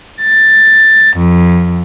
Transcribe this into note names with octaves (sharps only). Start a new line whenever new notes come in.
A6
F2